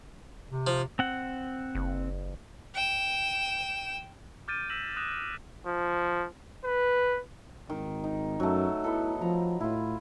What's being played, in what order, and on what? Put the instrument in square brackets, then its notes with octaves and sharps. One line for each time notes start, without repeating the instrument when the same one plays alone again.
[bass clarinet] C3
[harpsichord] F3
[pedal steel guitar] C4 F#5
[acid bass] F#1
[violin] G5 E7
[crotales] D6 F6 G6 A6 D7 D#7
E6 A#6 B6 E7 F#7
D#6 F#6 A6 A#6 E7
[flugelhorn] F3
B4
[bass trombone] G#1 [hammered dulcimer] D#3
[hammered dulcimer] D#4
[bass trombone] F#2 [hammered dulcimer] F#3 A3
[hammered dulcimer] B3 D#4 A4 [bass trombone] E4
[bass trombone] F3 [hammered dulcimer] A#5
[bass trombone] A2 [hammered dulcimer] E4 F4